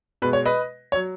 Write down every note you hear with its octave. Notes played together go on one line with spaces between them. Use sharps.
B2 G#3 B4
C#5
B4 D#5
C#5
F#3